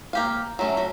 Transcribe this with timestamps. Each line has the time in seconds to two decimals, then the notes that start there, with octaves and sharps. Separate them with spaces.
0.13 A#3 G4 F5
0.59 F#3 A3 C#4
0.77 F#3